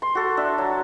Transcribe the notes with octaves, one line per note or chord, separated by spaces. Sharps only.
C6
F#4 A4
D4 E5
F#3